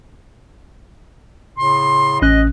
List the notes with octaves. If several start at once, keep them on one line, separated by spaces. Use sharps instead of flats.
A2 C#3 C6
A1 C#4 D#5 F#6